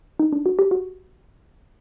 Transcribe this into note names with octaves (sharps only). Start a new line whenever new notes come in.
D#4
D4
F#4
G4
F#4